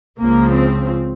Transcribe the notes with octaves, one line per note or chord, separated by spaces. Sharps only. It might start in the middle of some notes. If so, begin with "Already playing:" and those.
C#2 C#3 F3 A#3
C4